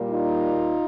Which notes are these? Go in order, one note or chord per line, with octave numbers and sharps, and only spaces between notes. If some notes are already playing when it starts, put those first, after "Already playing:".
Already playing: A#2 G3 A#3
D#4 F4